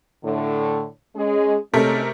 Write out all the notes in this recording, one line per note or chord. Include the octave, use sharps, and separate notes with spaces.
A2 D3
G#3 C#4 G#4
C3 G#3 A3 C#4 D#4 A#4